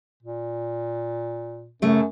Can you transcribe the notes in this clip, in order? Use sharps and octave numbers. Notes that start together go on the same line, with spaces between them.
A#2
F#2 C#3 A3